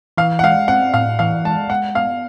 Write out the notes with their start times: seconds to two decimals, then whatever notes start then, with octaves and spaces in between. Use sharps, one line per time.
0.18 E3 F5
0.39 F#5
0.44 G#3 F5
0.68 C4 F#5
0.94 A2 F5
1.19 E3 F5
1.45 G#3 A5
1.70 G#3 F#5
1.95 B3 F5